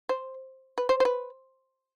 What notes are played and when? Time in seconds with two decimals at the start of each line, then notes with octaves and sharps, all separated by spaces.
0.09 C5
0.78 B4
0.89 C5
1.00 C5
1.05 B4